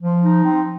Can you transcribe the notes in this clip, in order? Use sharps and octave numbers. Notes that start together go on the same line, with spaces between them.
F3
D#4
C4